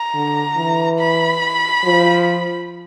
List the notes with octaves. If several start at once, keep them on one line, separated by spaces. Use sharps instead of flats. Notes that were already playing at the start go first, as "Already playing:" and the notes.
Already playing: A#5
D3
E3
B5
F3